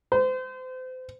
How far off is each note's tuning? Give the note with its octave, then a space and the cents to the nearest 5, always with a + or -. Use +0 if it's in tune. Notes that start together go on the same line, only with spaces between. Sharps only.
C5 -35